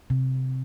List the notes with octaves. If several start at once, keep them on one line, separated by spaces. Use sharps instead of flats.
C3